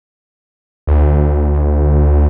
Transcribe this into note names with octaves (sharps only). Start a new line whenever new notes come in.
D2